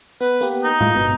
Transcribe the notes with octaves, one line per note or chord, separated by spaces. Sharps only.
B3 B4
A#3 B3 G4
D#4
A2 G#3 F4
G1 B2